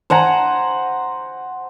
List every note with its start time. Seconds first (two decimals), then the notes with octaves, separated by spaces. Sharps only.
0.10 C5 F#5 G#5 A#5